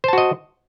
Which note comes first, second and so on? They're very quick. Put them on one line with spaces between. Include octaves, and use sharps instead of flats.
C5 A5 F#4 D#5